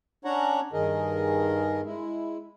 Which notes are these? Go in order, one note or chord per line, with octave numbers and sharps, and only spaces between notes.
C#4 D4 C#5 F#5 A#5
G2 D#3 G#4 A#4 D#5
G#3 E4